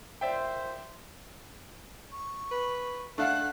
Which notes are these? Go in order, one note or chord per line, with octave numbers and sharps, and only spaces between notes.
A#2 C5 D5 E5 G5
C#6
B4
A3 D4 F5 F#5 F#6